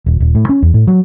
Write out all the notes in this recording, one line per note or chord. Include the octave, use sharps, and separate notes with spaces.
D#1
D#1
A2
C#4
E2
A2
F#3